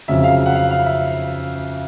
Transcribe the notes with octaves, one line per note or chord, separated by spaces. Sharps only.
F2 C#3 F#3 E5
F5
F#5
F5
F5
E5